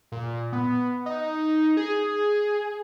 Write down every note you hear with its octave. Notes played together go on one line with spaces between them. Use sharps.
A#2
B3
D#4
G#4